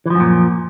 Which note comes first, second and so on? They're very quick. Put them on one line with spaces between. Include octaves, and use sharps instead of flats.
E3 F3 F#2 A#2